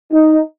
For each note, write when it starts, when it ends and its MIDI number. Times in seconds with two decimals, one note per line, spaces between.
0.13 0.40 63